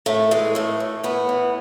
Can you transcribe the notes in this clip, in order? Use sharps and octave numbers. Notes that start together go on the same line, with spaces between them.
A2 A3
E3 G#3
A2 A3
A2
A2 B3
E3